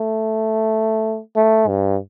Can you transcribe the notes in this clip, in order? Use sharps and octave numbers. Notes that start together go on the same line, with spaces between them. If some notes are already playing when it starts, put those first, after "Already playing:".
Already playing: A3
A3
G2